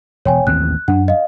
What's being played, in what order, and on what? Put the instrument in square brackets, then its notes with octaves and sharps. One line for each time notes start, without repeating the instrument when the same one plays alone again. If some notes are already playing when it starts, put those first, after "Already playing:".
[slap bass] E1 [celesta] C#5 G5 G#5
[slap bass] A1 D#2 C4 [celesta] F#6
[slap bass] F#2 [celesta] D4 F#5
[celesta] D#5 F5